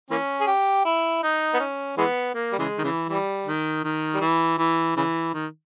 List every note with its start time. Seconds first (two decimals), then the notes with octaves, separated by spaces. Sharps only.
0.11 E3 A#3 C#4
0.41 G#4
0.47 G4
0.85 E4
1.23 D#4
1.54 B3
1.60 C#4
1.98 E3 G#3 B3
2.35 A#3
2.52 G3
2.59 C#3 E3 G#3
2.79 D#3
2.84 C#3 E3
3.09 E3 G3
3.46 D#3
3.84 D#3
4.14 G3
4.21 E3
4.58 E3
4.96 C#3 E3
5.34 D#3